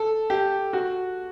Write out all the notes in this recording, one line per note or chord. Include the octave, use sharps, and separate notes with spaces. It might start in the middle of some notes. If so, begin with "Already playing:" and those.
Already playing: A4
G4
F#4